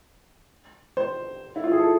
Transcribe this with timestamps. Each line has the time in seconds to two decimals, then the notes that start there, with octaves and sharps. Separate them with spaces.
0.97 C5
1.56 E4
1.64 F4
1.72 G#4
1.79 A4